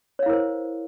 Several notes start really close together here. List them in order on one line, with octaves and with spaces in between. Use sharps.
C#5 F5 E4 A#4 C5